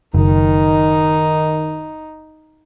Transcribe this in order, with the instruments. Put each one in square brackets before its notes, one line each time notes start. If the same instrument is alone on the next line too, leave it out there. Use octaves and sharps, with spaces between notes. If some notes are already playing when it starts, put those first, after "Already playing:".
[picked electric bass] F#1 [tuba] D#3 [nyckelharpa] D#4